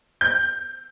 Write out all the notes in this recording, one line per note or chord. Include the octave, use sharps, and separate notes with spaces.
G6